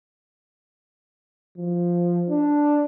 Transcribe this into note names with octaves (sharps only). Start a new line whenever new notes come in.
F3
D4